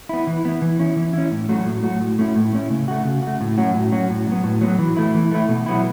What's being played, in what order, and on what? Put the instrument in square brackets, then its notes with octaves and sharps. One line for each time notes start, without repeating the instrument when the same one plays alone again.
[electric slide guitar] B3 E4
E3
B3 E4
E3
C#4 E4
E3
C#4 E4
A2
F#3 A3 F#4
A2
F#3 A3 F#4
A2
A3 C#4 E4
A2
A3 C#4 E4
C#3
A3 F#4
C#3
A3 F#4
A2
F#3 C#4 F#4
A2
F#3 C#4 F#4
A2
F#3 B3
A2
F#3 B3
E3
A3 E4
E3
A3 E4
B2
F#3 B3 E4